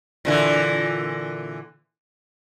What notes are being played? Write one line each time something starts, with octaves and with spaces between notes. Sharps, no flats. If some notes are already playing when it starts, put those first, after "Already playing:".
A#2 D3 E3